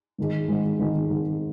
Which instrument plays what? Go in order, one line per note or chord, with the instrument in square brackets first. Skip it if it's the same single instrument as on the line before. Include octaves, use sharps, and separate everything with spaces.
[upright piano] G#2 D#3 G#3
G#2 D#3 G#3
G#2 D#3 G#3
G#2 D#3 G#3